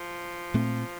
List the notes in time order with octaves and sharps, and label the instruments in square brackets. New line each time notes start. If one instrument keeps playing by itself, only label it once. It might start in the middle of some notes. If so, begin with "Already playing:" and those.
Already playing: [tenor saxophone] F3
[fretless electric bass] A#2 A3 C4